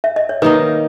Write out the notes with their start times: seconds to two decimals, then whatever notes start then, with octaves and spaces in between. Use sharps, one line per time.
0.04 E5
0.16 D#5
0.29 C#5
0.42 D#3 A#3 D#4 B4